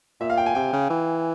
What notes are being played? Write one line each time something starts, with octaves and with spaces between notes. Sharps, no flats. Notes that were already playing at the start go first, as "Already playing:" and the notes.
A#2 E5
F5
G5
G#5
C3 G5
C#3
E3